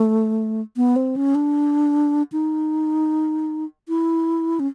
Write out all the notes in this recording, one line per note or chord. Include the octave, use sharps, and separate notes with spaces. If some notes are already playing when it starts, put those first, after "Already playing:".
Already playing: A3
B3
C4
C#4
D4
D#4
E4
C#4